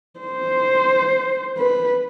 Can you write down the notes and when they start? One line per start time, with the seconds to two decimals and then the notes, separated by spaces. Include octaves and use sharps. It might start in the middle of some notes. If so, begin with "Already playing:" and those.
0.20 C5
1.58 B4